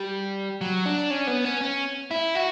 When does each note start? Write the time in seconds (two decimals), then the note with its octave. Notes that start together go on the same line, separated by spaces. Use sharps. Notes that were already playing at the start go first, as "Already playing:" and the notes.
Already playing: G3
0.61 F#3
0.86 D4
1.11 C#4
1.27 B3
1.44 C#4
1.61 C#4
2.11 E4
2.35 F#4